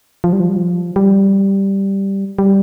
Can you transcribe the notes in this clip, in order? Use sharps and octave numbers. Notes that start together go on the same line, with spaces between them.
F3
G3
F3
G3
F3
G3
G3